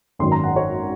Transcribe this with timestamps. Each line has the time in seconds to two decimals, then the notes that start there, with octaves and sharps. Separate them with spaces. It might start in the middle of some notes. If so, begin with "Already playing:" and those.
0.19 G#1 F#2 D#3 C6
0.32 A#5
0.44 F#5
0.56 C#5